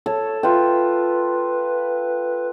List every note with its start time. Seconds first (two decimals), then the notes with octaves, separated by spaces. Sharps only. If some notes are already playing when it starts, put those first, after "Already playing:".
0.06 A4 C#5
0.43 F4 B4 G5